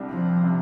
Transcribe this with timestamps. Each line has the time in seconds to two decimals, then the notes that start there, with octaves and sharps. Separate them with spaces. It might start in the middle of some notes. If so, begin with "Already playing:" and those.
Already playing: C2 C3 G3 D4
0.09 F3
0.43 C3 G3 D4